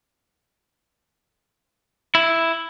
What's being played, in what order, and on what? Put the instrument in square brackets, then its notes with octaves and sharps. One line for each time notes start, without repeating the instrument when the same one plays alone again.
[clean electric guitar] E4